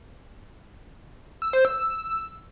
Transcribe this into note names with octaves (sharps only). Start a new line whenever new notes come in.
E6
C5
E6